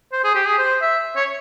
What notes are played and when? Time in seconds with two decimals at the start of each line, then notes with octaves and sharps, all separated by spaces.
0.12 C5
0.24 G#4
0.35 G4
0.47 G#4
0.58 C5
0.82 E5
1.16 C#5